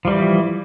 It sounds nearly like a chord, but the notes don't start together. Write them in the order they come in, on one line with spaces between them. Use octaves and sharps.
F3 G3 E3